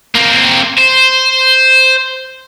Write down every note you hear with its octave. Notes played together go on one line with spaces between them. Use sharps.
A#3 C4
C5